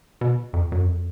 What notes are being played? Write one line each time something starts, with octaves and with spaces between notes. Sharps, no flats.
B2
F2
F#2
F2